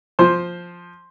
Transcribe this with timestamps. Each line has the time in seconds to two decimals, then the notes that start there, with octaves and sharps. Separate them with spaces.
0.19 F3 C5